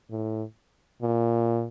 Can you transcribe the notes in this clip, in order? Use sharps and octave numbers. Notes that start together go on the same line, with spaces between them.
A2
A#2